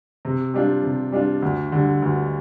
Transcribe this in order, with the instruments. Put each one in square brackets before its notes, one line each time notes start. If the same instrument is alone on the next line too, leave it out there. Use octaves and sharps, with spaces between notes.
[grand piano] C3
G3 D4 F4
C3
G3 D4 F4
D2
D3 G3
D2